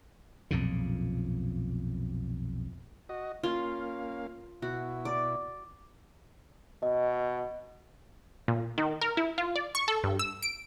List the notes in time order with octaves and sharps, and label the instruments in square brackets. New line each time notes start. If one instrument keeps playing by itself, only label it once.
[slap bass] B1 F2 A#2 C#3
[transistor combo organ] F#4 D#5
[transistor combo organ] A#3 C#4 F5 [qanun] F4
[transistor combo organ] B2 E4 [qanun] F#4
[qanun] D5
[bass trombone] B2 [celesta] D#5
[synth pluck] A#2
D#3
A#4
E4
F4
D5
C#6
A4
G2
E6
D7